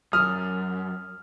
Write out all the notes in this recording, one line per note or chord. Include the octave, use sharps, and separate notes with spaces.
F#2 D#6 F6